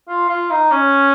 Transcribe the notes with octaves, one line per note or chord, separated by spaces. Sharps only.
F4
F4
D#4
C#4